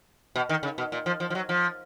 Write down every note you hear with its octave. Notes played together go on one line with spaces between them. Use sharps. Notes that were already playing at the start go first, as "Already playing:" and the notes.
B2
D#3
C#3
B2
A#2
F3
F3
F3
F#3
F3